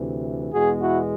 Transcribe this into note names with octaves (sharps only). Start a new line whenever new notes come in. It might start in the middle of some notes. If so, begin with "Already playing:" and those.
Already playing: D2 C3 E3
E2 B2 G#3 F#4 G#4
E4 F#4